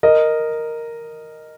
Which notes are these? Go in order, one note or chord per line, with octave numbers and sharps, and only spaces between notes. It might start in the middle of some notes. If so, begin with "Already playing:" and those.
A#4 D#5